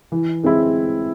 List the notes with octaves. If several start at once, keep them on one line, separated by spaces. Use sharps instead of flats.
E3
G#3 C4 E4